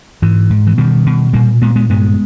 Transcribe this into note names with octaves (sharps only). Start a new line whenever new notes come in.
G#2 E3
G#2
E3
B2 D#3 G3
B2
A#2 G3 A#3
A#2 G#3 B3
G#3 B3
G2 G#3 B3